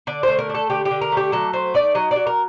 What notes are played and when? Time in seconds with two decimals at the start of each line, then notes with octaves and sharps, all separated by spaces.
0.07 D3 D5
0.23 A3 C5
0.39 A#4
0.49 D4
0.55 A4
0.70 D3 G4
0.85 G4
0.91 D3
1.01 A#4
1.12 A3
1.17 G4
1.32 F#3 A4
1.53 A3 C5
1.74 D#4 D5
1.95 F#3 D#5
2.11 F#3 D5
2.27 A#4